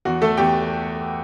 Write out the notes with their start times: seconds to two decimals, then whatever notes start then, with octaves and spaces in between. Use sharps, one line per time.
0.05 E2 F#4
0.22 A3 A4
0.37 E2 G4 G5